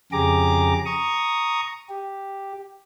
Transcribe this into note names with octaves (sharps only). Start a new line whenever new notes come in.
F2 C#3 G4 G#4 A#5 D6
A#5 C#6 D#6
G4